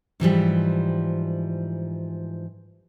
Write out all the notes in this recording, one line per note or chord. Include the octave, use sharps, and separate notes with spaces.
G#2 E3 F3 G3